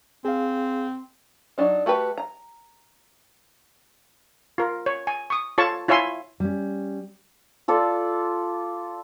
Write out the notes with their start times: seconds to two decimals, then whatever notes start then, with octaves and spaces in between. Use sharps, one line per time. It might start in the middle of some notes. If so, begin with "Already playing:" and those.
0.25 C4 G#4 F5
1.58 F#3 D4 D#4
1.86 A3 F#4 G4 B4
2.18 A#5
4.58 F4 A#4
4.86 C#5
5.07 G#5
5.30 C#6 D#6
5.58 F4 A4 C#5 A5 C#6
5.88 E4 F4 C#5 E5 G#5 C6
6.40 G3 C#4
7.68 F4 A4 D5